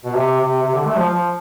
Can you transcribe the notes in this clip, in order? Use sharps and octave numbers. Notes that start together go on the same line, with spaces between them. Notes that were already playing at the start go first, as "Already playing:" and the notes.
B2
C3
C3
C3
D3
A3
F3
F3